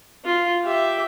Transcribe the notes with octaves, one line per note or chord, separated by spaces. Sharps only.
F4
G4 E5